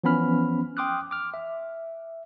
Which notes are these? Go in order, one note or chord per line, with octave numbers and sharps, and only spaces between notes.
E3 F3 B3 C#4 B5 F6
G5 C6 D6 D#6 F6 F#6
D6 F6
E5